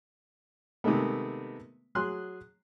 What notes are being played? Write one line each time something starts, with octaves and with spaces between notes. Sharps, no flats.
C3 D#3 G#3 A3 B3
F#3 G#4 C6 F#6